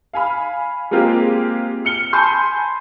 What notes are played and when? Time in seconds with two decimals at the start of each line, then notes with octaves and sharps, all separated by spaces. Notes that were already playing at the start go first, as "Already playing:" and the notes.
0.13 F5 G#5 B5 F6
0.91 G#3 A#3 C4 F4 G4 G#4
1.85 F6 C#7 G7
2.13 G#5 A5 B5 C6 G6